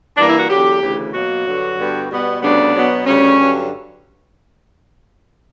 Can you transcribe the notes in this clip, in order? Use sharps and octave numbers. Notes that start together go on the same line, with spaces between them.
G2 E3 A#3 D4
E4
F#4
E2 D3 F#3 G4
D2 C#3 E3
B2 F#3 A#3 F#4
G2 D3 F#3
G2 D3 G3 B3
B2 G3 B3
D2 C#3 G3 B3 D4
B2 F#3 B3
D2 C#3 G3 C#4
G2 D3 F#3